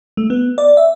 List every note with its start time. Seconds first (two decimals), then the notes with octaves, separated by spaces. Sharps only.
0.17 A3
0.30 B3
0.58 D5
0.77 E5